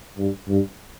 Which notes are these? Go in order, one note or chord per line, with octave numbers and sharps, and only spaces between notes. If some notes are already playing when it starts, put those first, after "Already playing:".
G2
G2